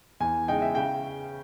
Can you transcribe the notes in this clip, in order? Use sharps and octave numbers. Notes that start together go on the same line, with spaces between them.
E2 G#5
C#3 G#3 D#4 G5
E5
C#3 G5